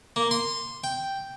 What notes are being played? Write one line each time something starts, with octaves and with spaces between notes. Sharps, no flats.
A#3
C6
G5